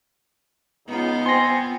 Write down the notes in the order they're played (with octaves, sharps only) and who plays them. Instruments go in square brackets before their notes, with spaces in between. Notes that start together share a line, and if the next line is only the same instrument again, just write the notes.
[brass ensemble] C#2 D#4 [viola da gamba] B3 F4
[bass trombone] C4 [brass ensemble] G#5 [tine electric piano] C6 A#6